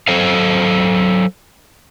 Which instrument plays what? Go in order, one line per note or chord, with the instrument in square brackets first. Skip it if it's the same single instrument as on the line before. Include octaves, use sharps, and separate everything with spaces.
[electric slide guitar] F#3 A4 C5 F5